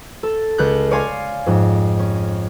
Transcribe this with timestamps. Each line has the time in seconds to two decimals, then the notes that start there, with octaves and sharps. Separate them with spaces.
0.23 A4
0.58 C#2 F#6 G6
0.91 C#5 D5 F5 G#5 C6
1.46 F2 G#2
1.99 C#4